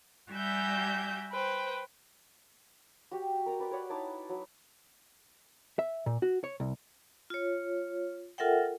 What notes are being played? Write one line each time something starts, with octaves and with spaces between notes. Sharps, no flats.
G3 F#4 G4 E5 G#5 G6
B4 C5 G5
F#4 G4
A#4 D5 A#5
B4 D5 C6
B4 C#5 D5 F#5
D#4 E4 A5 D6
F#3
E5
A#2
F#4
C#5
C2
F4 C#5
F4 A4 A#4 E5 F#5 G5